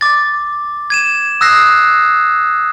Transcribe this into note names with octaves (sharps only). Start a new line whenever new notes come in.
D6 A6
G#6 D#7 E7
D#6 E6 F#6 A#6 C7